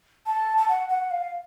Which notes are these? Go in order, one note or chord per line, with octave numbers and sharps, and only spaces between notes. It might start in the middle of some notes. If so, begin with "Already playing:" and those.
A5
A5
F#5
F#5
F5